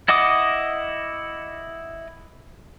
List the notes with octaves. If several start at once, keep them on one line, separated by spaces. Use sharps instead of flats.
E4 D#5 F#5 D6 D#6